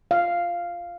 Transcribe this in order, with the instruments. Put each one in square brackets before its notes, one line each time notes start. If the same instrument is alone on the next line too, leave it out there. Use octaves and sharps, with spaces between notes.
[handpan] F5